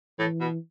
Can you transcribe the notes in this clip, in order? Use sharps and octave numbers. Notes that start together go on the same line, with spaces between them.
A2 E3
B2